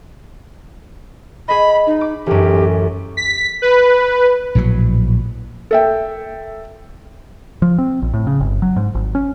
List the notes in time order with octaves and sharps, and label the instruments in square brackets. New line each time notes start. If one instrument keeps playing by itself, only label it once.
[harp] G#4 D#5 [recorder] B5
[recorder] D#4
[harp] D6
[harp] A1 F#2 [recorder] G4
[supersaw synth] B6
B4
[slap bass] A#1 A2 E3 F#3
[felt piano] A4 E5 G5
[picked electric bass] F3
C4
A#1
A2
C#3
G1
F#3
G#2
G#1
C#4